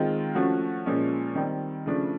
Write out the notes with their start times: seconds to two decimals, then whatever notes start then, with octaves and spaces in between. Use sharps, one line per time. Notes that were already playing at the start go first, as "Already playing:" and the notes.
Already playing: D#3 G#3 C4 F4
0.35 F3 A3 C#4 F#4
0.86 A#2 F3 G#3 C#4
1.35 D#3 G3 C4
1.86 C#3 F3 A3 D4